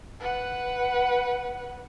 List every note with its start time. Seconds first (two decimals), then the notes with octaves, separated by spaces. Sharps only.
0.20 B4 F#5